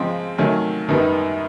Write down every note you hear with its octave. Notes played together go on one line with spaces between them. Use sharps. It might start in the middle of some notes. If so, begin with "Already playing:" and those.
Already playing: C#3 F3 G#3 C4
C3 D#3 F#3 A3 C#4
F#2 D#3 G3 B3 D#4